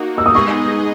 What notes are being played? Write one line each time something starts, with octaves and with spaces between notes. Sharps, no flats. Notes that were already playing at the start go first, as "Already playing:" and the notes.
Already playing: A#3 D#4 F#4
E6
D#6
G#3 B3 D#4 G#4 D#5 C#6